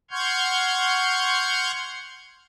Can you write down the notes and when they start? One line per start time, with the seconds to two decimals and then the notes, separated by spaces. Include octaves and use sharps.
0.11 F#5 C6 C#6 F6 G6 G#6